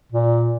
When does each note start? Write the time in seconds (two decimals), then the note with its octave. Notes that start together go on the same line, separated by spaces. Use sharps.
0.12 A#2